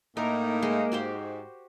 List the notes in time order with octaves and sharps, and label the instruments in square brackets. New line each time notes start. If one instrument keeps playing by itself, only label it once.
[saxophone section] A2 D#4 [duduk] A#3 [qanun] A#4
[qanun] G#3
[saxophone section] G#2 [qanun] F#4 G4 C5